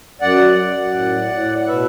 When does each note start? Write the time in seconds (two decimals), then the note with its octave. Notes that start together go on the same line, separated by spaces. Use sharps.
0.21 F#2 D5 F#5
0.58 F#2
0.94 A2
1.31 A2
1.61 F#5
1.68 B2 B4 E5